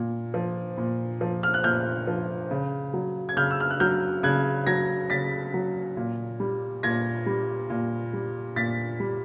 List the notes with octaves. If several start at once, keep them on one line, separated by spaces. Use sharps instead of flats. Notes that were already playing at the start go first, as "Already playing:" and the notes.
Already playing: A#2
F3
A#2
F3
F6
F#6
A#2 F6 G6
F3
C#3
F#3
G#6
C#3 F6 G6
E6
F6
F#6
F#3 F6 G6
C#3 F#6 G#6
F#3 G#6 A#6
C#3 A6 B6
F#3
A#2
G3
A#2 G#6 A#6
G3
A#2
G3
A#2 A6 B6
G3